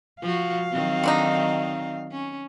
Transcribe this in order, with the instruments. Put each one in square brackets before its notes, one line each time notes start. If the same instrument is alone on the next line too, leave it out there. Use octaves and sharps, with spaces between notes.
[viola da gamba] F3 F#4 [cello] F5
[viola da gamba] D#3 F#3 C4
[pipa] D3 D4 D#4
[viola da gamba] C#4